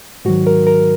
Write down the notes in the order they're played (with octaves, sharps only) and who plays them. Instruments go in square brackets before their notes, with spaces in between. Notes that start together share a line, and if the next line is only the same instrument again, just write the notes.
[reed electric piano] G#2 D#3 F#3 F#4
A#4
A#4